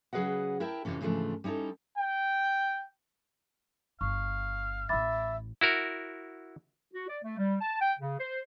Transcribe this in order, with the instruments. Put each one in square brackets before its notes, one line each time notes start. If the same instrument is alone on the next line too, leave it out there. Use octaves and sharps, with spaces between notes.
[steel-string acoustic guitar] C#3 F#3 G#4 B4 D#5 F#5
E4 A#4 E5 G5 A5
F2 G#2 C3 E3 C#4
G#2 C#3 E3 F3 A3 D4
G3 C#4 D#4 E4 A4
[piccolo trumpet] G5
[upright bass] G1 [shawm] F5 [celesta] C#6
[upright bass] A1 E3 [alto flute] E5 [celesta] B5 D6 A6
[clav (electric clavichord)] E4 F#4 A#4
[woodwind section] F#4
D5
A3
G3
A5
G5
C#3
C5